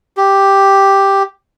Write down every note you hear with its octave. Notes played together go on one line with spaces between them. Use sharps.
G4